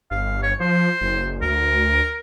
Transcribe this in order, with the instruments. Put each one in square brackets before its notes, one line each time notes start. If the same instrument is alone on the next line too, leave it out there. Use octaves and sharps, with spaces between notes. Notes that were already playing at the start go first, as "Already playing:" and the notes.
[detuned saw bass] G1 [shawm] F5
[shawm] C#5
[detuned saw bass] F3 [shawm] C5
[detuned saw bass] F#1
[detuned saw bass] D2 [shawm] A#4